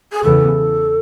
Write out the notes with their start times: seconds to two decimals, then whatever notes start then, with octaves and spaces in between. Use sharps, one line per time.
0.12 G#4
0.23 E2 C#3 E3 B3 A4